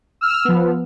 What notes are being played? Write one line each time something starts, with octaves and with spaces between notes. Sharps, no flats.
E6 F6
F3 B3